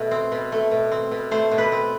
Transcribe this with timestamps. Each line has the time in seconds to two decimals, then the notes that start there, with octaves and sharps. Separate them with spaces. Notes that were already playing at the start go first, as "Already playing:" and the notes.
Already playing: B2 A3
0.11 C4
0.32 B2
0.52 A3
0.71 B2
0.92 C4
1.11 B2
1.31 A3 C5
1.52 B2
1.58 B4
1.72 C4